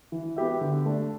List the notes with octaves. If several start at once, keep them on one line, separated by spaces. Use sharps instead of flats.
E3
B3 G4 E5
D3
A3 D4